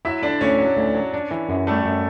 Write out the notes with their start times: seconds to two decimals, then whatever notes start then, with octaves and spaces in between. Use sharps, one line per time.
0.05 F#3 E4 E5
0.22 D3 D4 D5
0.41 D2 C#4 C#5
0.59 F#3
0.76 D2
0.95 F#3
1.14 D4
1.31 E3
1.49 F#2
1.67 G3 A3 A4
1.85 F#2